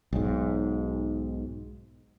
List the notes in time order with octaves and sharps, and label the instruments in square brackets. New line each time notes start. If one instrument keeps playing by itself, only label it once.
[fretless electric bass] B1 G#2